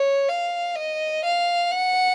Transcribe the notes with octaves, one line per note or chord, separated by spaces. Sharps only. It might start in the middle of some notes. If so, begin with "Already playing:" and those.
Already playing: C#5
F5
D#5
F5
F#5